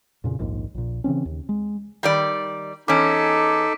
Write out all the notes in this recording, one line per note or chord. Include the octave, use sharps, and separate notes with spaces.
F2 A#2 C#3
A#1 D#2 G#2
A#1 A#2
C#3 E3 C4 C#4
D#2
G#3
D#3 G3 D5
E2 C#4 D#4 A4 D6 B6 D7